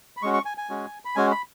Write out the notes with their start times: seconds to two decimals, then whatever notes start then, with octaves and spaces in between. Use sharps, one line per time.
0.17 B5
0.22 G#3 C#4 F#4 C#6
0.34 C#6
0.45 G#5
0.58 G#5
0.70 G#3 C#4 F#4
1.05 B5
1.16 G#3 C#4 F#4 G#5
1.31 B5